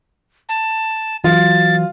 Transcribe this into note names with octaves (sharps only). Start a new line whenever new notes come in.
A5
E3 F#3 F4 A6